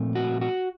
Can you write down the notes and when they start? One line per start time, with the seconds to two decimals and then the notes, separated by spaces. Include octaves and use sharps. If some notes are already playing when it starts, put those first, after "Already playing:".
Already playing: A#2 F3 A3 C4
0.15 F#4
0.41 F#4